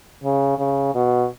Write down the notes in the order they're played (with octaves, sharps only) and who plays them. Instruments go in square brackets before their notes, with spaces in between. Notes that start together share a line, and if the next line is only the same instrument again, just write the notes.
[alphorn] C#3
C#3
B2